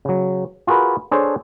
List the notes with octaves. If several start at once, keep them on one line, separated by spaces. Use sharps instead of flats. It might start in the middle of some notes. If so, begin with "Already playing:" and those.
C#3 F#3
F4 F#4 G#4 A#4 B4
D4 G#4 A4 C5 C#5